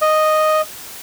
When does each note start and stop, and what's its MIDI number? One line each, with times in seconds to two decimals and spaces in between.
0.02 0.61 75